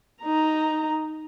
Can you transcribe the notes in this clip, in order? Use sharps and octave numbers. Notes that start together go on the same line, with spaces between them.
D#4 A#5